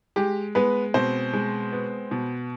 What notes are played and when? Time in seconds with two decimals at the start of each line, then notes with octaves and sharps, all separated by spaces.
0.16 G#3 G4
0.55 G#3 B3 B4
0.94 B2 C4 C5
1.33 G#3
1.73 B3
2.11 B2